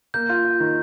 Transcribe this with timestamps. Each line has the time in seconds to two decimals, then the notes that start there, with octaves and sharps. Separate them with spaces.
0.14 A#3 G6
0.29 F4
0.45 F4
0.60 D#3